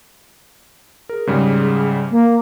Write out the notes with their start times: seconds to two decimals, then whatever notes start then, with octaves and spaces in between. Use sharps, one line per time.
1.09 G#4 A#4
1.27 G#2 C#3 G3
2.10 A#3